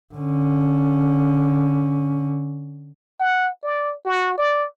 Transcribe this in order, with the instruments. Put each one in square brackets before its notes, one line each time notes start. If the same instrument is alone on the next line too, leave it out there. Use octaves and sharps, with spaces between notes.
[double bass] D3 C#4
[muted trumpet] F#5
D5
F#4
D5